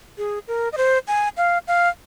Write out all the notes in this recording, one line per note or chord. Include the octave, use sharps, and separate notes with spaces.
G#4
A#4
D#5
C5
G#5
F5
F5